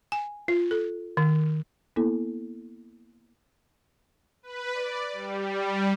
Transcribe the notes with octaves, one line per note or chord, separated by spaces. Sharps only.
G#5
F4
A4
D#3
A#3 B3 E4 A4
B4
D5
G3